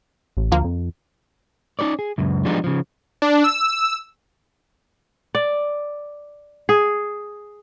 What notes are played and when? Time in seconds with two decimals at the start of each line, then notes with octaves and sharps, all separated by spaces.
0.37 A1
0.52 D2 F3 A#3
0.64 F2
1.79 C#4 D#4 G4 C#5 D5
1.99 G#4
2.18 C#2 F#2
2.45 F3 G3 G#3 B3 D4 D#4
2.64 C#3 F3
3.22 D4
3.44 E6
5.35 D5
6.69 G#4